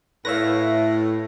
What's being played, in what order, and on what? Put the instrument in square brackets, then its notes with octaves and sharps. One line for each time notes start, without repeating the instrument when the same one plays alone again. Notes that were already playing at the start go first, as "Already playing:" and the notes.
[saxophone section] A2 [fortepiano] B4 C#5 F5 [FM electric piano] E5 A#6